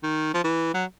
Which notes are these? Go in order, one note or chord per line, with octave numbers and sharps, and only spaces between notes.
D#3
F3
E3
F#3